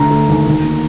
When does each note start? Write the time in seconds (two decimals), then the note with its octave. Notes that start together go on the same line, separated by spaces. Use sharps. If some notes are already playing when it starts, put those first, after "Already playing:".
Already playing: D2 D3 A3 A#5
0.10 A3
0.29 D#2
0.47 D#2
0.64 A#3